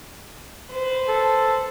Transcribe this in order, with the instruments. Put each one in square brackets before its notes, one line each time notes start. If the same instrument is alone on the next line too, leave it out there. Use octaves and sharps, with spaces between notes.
[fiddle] B4 C5
[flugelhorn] A4